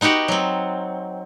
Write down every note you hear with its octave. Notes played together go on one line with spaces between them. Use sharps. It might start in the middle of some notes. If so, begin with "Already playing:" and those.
B3 D#4 F#4 G4 F#5
F#3 C4